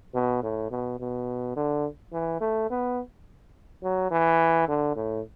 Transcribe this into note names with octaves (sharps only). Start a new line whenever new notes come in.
B2
A2
B2
B2
D3
E3
A3
B3
F#3
E3
D3
A2